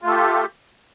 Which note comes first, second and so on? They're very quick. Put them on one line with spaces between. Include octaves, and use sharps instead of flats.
F4 A3 A4 G4